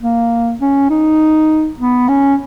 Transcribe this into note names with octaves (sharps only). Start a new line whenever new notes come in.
A#3
C#4
D#4
B3
C#4